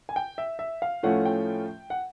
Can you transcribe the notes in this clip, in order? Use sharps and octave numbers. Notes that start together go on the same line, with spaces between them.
G#5
G5
E5
E5
F5
A2 F3 A3 C#4 F4 F#5
G5
F#5